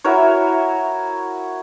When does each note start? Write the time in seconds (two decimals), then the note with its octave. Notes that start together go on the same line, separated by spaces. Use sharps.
0.04 E4 F#4 A#4 C#5